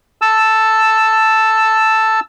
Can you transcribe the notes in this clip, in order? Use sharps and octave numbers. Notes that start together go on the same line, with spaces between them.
A5 E6